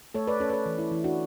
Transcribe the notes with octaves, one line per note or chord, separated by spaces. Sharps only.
A3 A4 C#5
B4 D5
C#4 A4 C#5
B4
A4 C#5
E3
E4
E3 E4
D4 F#4